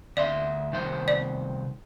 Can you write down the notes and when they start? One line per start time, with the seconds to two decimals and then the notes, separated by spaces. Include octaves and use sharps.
0.17 D2 D5 E5 C6
0.72 C2 D#3 C5
1.08 D5